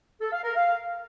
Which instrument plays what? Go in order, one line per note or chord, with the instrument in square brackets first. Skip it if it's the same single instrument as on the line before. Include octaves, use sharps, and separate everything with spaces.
[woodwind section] A4
F5
A#4
F5